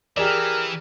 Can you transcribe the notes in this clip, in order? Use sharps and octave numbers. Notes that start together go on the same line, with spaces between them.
E3 G4 G#4 A#4 D5